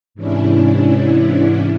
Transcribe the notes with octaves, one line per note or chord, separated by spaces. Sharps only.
G#2 C3 E3 C#4 D4 E4